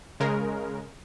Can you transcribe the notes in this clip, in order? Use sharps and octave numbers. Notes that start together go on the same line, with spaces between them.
C#3 G#3 A#4